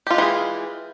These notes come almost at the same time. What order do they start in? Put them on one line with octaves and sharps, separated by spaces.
G4 F4 G#3 E3 G#4